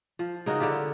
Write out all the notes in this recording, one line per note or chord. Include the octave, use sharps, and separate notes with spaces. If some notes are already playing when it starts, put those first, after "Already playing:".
F3
C#3 D#4 F#4 A#4
D3 E4 F4 G4